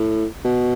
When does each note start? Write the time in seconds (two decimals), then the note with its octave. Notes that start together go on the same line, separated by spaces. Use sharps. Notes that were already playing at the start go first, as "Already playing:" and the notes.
Already playing: A2
0.45 B2